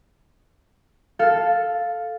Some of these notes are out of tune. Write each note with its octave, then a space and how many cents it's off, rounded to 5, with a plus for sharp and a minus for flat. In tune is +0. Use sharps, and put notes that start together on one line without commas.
A4 +0 F5 +5